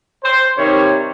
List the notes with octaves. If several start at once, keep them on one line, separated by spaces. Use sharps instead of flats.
C5
C3 D#3 G3 C#5